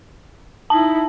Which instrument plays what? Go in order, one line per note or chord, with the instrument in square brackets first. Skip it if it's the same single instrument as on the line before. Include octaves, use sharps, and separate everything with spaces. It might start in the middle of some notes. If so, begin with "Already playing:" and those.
[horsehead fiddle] D#4 E4 [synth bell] A5